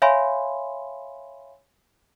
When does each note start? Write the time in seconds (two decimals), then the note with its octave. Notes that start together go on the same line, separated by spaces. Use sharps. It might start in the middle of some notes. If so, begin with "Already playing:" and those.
0.02 C#5 E5 F5 G#5 B5 C6